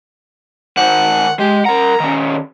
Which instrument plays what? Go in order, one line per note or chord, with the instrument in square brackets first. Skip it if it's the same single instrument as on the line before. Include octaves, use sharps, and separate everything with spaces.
[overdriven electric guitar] D#3 C5 [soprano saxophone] F#5
[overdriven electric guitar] G#3 [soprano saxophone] G4
[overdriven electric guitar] A#4 F#5 [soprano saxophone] A#5
[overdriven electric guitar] D#3 C#4